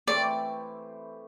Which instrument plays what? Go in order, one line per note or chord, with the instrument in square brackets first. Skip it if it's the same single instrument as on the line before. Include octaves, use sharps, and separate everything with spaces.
[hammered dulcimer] E3 A3 C4 G4 [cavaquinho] D5